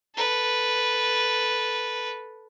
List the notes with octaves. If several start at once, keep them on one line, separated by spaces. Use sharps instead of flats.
A4 B4